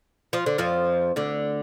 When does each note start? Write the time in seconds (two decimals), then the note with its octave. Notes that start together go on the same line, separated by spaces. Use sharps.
0.33 F3
0.46 D3
0.58 F2 F3
1.16 D2 D3